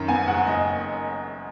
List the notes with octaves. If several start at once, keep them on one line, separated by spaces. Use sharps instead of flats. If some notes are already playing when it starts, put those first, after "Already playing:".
Already playing: F#2 D#3
B3 G#5
F#1 F#5
F#1 D#5